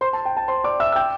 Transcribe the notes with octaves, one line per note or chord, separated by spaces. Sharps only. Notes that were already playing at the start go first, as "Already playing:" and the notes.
C5 C6
A5
G5
A5
C5 C6
D5 D6
E5 E6
E6
G5 G6